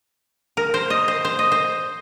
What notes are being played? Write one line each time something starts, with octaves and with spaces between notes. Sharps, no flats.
A#4
C5
D#5
C5
C5
D#5
C5